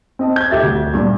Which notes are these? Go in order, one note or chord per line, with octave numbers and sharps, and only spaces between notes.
C4 D#5 A5
G6 G#6
D#1 G4 A4 E5 A6
D2
G2 A#2